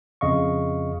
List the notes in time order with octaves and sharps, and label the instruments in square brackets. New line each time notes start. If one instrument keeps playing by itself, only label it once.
[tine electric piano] F2 C#3 D#5 F5 C#6